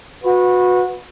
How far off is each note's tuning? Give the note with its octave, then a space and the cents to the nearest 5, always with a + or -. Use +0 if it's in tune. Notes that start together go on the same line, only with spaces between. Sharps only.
F#4 -25 B4 +0